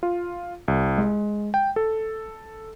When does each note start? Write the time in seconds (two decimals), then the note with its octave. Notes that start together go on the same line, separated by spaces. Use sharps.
0.03 F4
0.68 C2
0.98 G#3
1.54 G5
1.76 A4